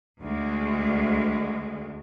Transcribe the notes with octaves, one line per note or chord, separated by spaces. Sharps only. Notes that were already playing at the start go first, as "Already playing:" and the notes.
D2 G#3